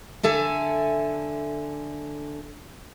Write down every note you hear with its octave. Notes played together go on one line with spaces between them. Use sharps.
D3 A4 E5 G#5